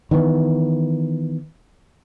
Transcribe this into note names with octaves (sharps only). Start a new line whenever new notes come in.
D#3 E3 A#3 B3